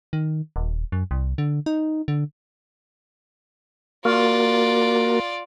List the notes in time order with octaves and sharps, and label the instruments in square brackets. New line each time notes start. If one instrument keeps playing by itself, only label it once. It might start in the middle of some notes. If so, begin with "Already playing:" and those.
[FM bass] D#3
D#1
F#2
C2
D3
D#4
D3
[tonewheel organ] A#3 F#4 A#4 [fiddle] F4 D5